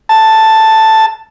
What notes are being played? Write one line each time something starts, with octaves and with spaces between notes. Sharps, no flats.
A5